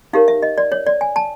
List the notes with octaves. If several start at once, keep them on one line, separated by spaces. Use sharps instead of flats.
D#4 G4 A#4 C#5 F5
E5
D#5
D5
C#5
D5
G#5
A5